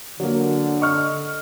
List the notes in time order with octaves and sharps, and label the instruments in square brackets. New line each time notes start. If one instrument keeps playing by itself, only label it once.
[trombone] D3 [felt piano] F#3 A#3
[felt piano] D#5 C#6 F6